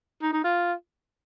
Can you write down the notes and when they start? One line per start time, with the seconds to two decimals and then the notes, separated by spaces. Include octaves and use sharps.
0.22 D#4
0.33 D#4
0.44 F4